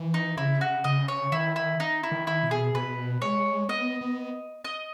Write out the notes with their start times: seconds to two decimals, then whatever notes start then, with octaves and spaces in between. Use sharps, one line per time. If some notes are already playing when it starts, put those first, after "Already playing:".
Already playing: E3
0.14 D#4
0.37 C#3 E4
0.61 F#4
0.84 C#3 D#5
1.08 C#5
1.32 D#3 E4
1.56 E4
1.80 D#4
2.03 E4
2.12 D#3
2.27 E4
2.43 B2
2.51 G#4
2.74 B2 B4
3.21 G#3 C#5
3.69 B3 D#5
4.01 B3
4.64 D#5